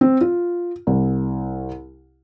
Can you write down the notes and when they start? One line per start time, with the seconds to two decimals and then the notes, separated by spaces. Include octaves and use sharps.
0.01 C4
0.21 F4
0.87 C2